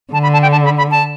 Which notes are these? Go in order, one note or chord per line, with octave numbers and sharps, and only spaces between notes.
D3 A5
B5
A5
G5
A5
B5
B5
A5